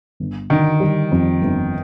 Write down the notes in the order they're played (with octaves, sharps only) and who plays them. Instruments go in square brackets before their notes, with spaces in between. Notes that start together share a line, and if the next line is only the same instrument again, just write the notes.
[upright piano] G1
[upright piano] D3 [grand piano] D#3
[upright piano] G3
F2
G1